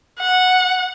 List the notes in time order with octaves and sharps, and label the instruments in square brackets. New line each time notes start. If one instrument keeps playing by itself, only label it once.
[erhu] F#5